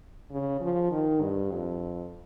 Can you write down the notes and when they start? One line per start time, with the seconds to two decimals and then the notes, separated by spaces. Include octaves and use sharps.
0.31 C#3
0.60 F3
0.91 D#3
1.21 G2
1.51 F2